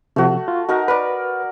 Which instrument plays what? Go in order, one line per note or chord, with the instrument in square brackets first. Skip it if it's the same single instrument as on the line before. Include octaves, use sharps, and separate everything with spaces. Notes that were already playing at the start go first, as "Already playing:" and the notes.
[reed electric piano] C3 F3 [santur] A3 F#4
[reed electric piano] F4
[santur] D#4 A#4 F#5 [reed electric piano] F#4
[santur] A#4 D5 [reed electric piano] B4